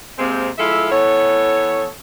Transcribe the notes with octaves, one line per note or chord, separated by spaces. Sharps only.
C3 G#3 A#3 C4
F3 G#3 E4 A4 E5 F5
E3 B3 A4 C#5